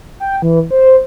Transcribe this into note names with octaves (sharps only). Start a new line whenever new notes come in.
G5
E3
C5